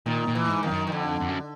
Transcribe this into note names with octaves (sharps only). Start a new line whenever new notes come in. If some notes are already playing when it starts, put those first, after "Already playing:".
A#2 D#3
A#2
E3
A2
G#2
F2 D#3
F#2
D#3
F2 D3
F2
F#2